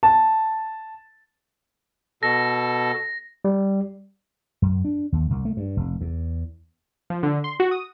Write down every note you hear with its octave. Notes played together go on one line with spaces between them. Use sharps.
A5
B2 A4 A#6
G3
F#2
D4
D#2
C2
A3
G2
F1
E2
F3
D3
C6
F#4
D#6